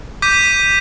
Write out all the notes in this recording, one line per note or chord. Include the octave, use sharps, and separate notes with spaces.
D6 G6 B6 D#7